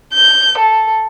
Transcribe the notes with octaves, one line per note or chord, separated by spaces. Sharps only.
G6
A4